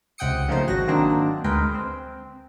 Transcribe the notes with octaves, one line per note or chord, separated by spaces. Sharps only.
C#2 C3 F#5 G5 D#6 C#7
C#3 F3 A3 A#3 D#4 C5
G#1 F#3 F#4 A#6
D#3 F#3 A#3 C4 D4 D#4
D2 G#3 A#4 B4 G5
C4